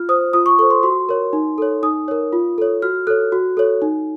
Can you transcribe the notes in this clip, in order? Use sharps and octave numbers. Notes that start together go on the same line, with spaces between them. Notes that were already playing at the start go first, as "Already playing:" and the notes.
Already playing: F4 F6
C5 D#6
F4 D#6
C#6
A4 C5 C#6
C6
F#4 C6
A#4 C#5
D#4
A4 C#5
D#4 D#6
A#4 C#5
F4
A4 C#5
F#4 F6
A4 C#5 F#6
F#4
A4 C#5
D#4